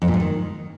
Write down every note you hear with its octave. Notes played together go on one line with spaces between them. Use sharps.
F2
A#2
G#2
D#3